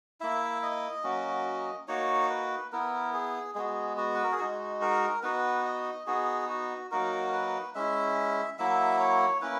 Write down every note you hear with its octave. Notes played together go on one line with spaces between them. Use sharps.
A#3 E4 E5
D#5
F#3 A#3 C#4 F#4
A#3 D#4 F#4 C#5
B4
B3 E4 A#4
G#4
G#3 B3 F#4 G#4
F#4
B4
A#4
G#4
G#3 D#4 F#4
A#4
B3 D#4 F#4 B4
D#5
B3 D#4 F#4 G#4
F#4
F#3 A#3 D#4 F#4 A#4
B4
G#3 C#4 E4 E5
F#3 A#3 E4 E5
C#5
A#3 C#4 E4 B4